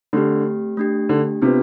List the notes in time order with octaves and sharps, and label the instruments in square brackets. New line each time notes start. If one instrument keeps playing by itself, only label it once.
[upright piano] D3 [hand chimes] A3 C4 G4
[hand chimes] A3 D4 G4
[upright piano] D3
[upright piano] C3 [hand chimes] B3 D4 F4 B4